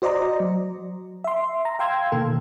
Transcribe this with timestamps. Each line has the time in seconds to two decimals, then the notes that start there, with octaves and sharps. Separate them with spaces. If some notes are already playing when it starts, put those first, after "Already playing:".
0.02 F#4 C5 D5 D#5 A#5
0.40 F#3
1.24 E5 C6
1.65 A#5
1.79 F5 G5 C6 E6 G#6
2.12 B2 D#3 A#3 A4